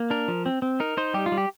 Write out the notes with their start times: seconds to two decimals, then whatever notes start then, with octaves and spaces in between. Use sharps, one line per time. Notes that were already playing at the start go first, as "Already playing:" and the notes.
Already playing: A#3
0.10 D4 A#4
0.28 F3
0.46 C4
0.62 C4
0.80 D#4 A#4
0.97 D#4 C5
1.14 G3 G4
1.26 F4
1.32 G3
1.38 G4